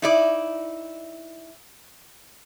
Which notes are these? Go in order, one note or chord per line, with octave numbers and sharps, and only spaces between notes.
D#4 E4 D5